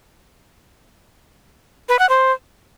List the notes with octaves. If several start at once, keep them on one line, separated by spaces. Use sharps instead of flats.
B4
F#5
C5